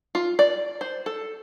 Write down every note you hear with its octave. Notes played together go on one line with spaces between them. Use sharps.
F4
D5
C5
A4